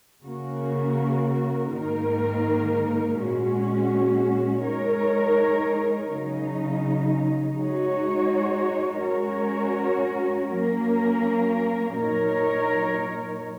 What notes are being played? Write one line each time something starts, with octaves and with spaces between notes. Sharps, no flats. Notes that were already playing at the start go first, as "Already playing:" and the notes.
C#3 A#3 F#4 A#4
G#2 D#3 A#3 D#4 A#4
A#2 G#3 C#4 F#4
G#3 D#4 A#4 C#5
C#3 F#3 D#4
G#3 D#4 F#4 C#5
G#3 C#4 F#4 A#4 C#5
F#3 A#3 C#4 A#4
A#2 F#3 D#4 A#4 C#5